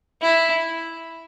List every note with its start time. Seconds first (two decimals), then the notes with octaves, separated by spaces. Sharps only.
0.21 E4